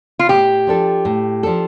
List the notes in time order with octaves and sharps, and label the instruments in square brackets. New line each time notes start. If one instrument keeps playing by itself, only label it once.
[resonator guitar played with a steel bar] F4
[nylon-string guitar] A2 [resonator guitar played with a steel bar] G4
[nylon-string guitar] F3 D4 A4
A2
F3 D4 A4